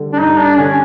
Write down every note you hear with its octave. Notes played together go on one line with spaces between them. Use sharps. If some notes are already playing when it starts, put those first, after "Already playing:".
Already playing: D3 G3
D4
G2 D#4
D4
D3 C#4